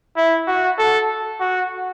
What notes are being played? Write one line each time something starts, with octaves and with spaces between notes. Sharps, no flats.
E4
F#4
A4
F#4